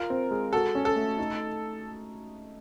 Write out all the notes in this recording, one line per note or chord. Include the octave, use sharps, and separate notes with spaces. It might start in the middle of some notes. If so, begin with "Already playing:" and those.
Already playing: F4 A#4
C4
G#3
F#4 A4
C#4
A4
A3
D#4